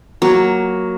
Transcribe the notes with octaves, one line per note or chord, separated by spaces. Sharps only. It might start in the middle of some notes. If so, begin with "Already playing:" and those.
F#3 A#3